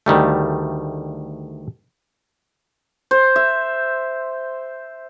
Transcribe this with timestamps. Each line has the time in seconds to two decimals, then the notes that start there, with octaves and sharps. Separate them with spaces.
0.06 D2 D#3 G3 A3
3.11 C5
3.36 E5